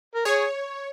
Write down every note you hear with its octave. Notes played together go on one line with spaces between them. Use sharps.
A#4
G#4 C#5